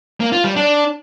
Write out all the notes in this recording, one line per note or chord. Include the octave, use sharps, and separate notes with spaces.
A#3
F4
G3
D4